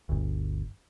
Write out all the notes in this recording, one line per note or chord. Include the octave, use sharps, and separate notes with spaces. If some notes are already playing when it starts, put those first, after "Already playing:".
G1 D2